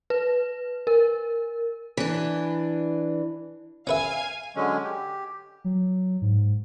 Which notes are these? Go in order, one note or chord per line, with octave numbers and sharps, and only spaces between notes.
B4
A#4
E3 D4
C#4 B4 E5 F5 G#5
D3 F#3 G#3 C#4
G4
F#3
G#2